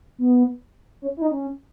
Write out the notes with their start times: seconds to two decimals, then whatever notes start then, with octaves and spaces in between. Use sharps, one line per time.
0.19 B3
1.02 C#4
1.17 E4
1.22 D#4
1.31 C#4